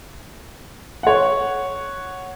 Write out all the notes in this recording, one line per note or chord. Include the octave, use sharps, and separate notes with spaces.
C#5 F#5